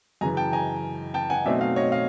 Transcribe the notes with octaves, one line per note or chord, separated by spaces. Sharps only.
F#2 C#3 E3 G#5 A#5
G5 A5
G#5 A#5
G5 A5
F#5 G#5
B2 F#3 A3 C4 D#4 D5 E5
D#5 F5
C#5 D#5
D#5 F5